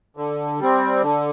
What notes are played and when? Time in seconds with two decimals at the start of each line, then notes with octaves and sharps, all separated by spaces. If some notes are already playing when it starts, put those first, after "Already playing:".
0.17 D3
0.59 G3 C4
1.02 D3